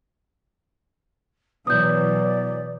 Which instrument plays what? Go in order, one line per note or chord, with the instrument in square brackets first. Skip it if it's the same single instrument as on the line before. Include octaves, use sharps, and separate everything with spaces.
[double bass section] B2 E3 F#3 [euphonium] B3 [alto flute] D5 [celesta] D#6 G6